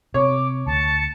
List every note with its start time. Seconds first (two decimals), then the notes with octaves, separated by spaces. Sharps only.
0.14 C3 C#5 D6
0.67 D2 A5 C#7